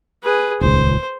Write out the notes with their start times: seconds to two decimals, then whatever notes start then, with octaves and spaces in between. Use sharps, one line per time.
0.23 G#4 B4
0.61 D#1 C#2 C5